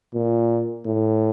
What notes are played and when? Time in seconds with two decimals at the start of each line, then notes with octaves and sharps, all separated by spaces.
0.14 A#2
0.85 A2